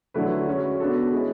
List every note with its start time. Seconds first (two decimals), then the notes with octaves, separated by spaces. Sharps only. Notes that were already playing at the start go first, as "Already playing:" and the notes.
0.14 D3 F#3 A3 E4 B4
0.48 G#3 C#4 F#4
0.80 B3 D4 F#4 A4
1.12 G#3 C#4 E4 B4